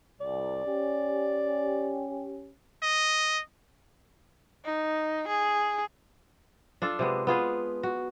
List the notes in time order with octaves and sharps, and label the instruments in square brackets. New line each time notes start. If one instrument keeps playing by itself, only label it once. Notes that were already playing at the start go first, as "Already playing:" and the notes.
[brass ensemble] C2 [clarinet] D5
[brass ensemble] C#4 G4
[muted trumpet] D#5
[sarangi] D#4
G#4
[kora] D4 F4 A4
C3 G#3 B3
B3 F4 G#4 B4
F#4